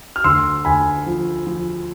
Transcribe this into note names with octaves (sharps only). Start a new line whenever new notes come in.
F6
D2 C6 E6
D2 G#5 B5
F3
F3